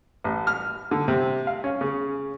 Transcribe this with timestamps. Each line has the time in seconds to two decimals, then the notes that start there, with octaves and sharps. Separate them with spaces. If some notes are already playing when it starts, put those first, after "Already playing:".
0.24 A1
0.47 F6
0.91 D3
1.08 C3
1.47 F5
1.64 C#4
1.81 C#3